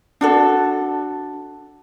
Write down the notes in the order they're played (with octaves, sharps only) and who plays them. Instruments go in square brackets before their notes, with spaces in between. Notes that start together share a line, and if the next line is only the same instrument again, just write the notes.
[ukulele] D4 F#4 A4